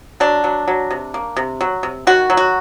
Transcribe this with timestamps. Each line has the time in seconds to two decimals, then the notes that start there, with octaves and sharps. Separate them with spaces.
0.20 F#3 D4
0.44 F#3
0.68 F#3
0.91 C3
1.14 A#3
1.37 C3
1.61 F#3
1.83 C3
2.07 D#3 F#4
2.30 F#3
2.37 F#4